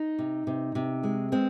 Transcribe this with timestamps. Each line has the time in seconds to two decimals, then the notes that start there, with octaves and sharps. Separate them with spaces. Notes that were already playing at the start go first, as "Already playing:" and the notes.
Already playing: D#4
0.18 C3
0.47 C3
0.75 C3
1.03 G#3
1.32 G#3 C4